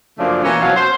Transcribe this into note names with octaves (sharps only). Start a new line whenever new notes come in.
F#2 C#3 F3 A3 A#3 D4
B2 E3 A#3 C#4
B2 F3 F#3 C#5 F5 F#5
C5